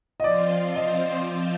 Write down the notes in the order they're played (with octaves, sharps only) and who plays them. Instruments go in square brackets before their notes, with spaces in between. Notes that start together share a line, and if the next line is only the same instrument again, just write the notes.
[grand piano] D#5
[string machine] F3 C4 F4 C5 [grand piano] D5
[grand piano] D#5